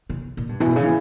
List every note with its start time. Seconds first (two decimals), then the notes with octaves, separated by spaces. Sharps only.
0.10 C#3
0.37 A#2
0.49 G2
0.60 B2 E3
0.76 C#3
0.83 E3